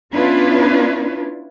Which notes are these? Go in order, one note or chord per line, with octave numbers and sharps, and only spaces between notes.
B3 C#4 D4 E4 F4 B4